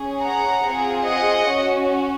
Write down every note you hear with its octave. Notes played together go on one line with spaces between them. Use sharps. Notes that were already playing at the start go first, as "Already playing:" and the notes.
Already playing: C#4 G#4
F#5 A#5
C4 F4 G#4
D#5 F#5
C#4 F#4